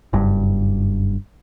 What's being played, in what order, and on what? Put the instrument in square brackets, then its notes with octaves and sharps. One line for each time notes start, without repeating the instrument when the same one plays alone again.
[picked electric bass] F#1 G2